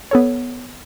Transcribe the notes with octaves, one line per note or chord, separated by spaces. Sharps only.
B3 A4 C#5